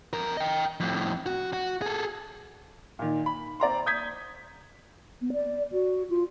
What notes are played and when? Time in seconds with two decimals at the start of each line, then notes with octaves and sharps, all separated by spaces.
0.13 F2 A#4
0.37 D#5 G5
0.80 F2 A2
1.26 F#4
1.53 F#4
1.82 G#4 A4
2.99 A#2 D#3
3.26 B5
3.60 C4 D5 A#5 C6
3.86 D#6 G6 G#6 B6
5.21 B3
5.33 D5
5.72 F#4
6.10 F4